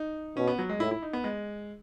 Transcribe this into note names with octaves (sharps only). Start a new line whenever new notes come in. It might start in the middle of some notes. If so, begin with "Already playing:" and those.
Already playing: D#4
B2 C#4
B3
F#3
G#3
A2 E4
E4
D#4
B3
G#3